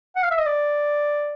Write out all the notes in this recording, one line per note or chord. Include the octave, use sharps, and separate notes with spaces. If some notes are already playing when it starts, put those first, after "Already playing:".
F#5
F5
E5
D#5
D5